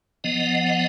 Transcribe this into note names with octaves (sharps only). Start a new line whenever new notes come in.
F3 B3 D#5 F#5